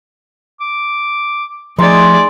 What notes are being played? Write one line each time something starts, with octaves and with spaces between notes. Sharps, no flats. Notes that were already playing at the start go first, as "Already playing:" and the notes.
D6
F3 A3 D#4 G#4 D5 C6